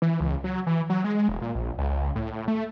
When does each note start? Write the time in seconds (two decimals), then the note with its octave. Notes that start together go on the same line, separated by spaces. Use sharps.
0.02 E3
0.20 C#2
0.44 F#3
0.67 E3
0.89 F#3
1.04 G#3
1.28 E1
1.42 A#2
1.55 A#1
1.78 C#2
2.15 A2
2.48 A3